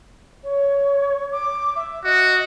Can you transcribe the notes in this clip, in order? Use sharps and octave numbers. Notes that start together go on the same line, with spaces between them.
C#5
D6
E5
F#4 D#5